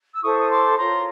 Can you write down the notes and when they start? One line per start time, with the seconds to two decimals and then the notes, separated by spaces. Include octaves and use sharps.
0.13 E6
0.21 E4 A4 C5 C#6 D#6
0.38 D#6
0.49 C6 D6
0.77 F4 A#4 C#5 A#5 C6